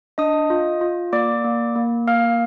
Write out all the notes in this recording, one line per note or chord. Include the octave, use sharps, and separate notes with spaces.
D4 D#5 D#6
F4
F4
A#3 D5 D6
A#3
A#3
A#3 F5 F6